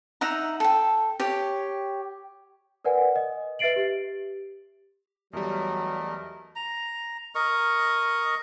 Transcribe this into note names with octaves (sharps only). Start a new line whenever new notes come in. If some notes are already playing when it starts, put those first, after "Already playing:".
D#4 E5 F#5 A#5
A4 G5
G4 C#5 G5
A#4 B4 D5 F#5 G#5
D#5
B4 E5 A6 C7 D7 F#7
G4
E2 F#3 G3 A3 A#4 D#5
A#5
A#4 D#5 C#6